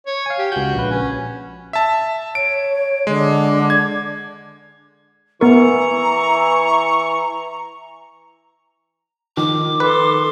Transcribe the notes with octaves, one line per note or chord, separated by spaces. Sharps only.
C#5
F5 G#5
G4
C#2 F#4 G6
A#1 B4
C#4
E5 A5
C#5 D7
D3 G#3
G#6
E3 B3 A#4 A#5 C#6
D#3 F3 D6
A4 B4 C6